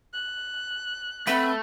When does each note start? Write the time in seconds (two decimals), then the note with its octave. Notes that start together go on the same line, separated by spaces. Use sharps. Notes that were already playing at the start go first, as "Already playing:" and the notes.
0.13 F#6
1.27 A3 C4 B4 F#5 B5